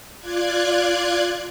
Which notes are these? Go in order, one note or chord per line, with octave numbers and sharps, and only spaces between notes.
F4 D5 F#6 G#6